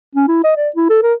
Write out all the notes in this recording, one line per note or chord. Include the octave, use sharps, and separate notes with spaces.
C#4
E4
D#5
D5
E4
A4
A#4